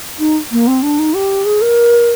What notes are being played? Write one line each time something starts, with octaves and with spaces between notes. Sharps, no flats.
D#4
A#3
C4
D4
D#4
G4
G#4
A#4